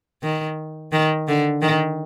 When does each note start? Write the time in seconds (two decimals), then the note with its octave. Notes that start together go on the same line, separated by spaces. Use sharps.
0.23 D#3
0.93 D#3
1.28 D3
1.62 D#3